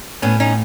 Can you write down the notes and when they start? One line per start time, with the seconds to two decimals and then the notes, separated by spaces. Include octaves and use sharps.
0.22 A2 B3 C#4
0.40 C#4 D#4